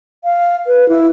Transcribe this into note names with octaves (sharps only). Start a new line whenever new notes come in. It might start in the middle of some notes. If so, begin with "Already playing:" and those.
F5
B4
E4